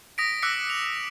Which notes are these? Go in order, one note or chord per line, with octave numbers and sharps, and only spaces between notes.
D#6 A#6 B6 D7
D6 E6 F#6 A#6 B6 C#7
F7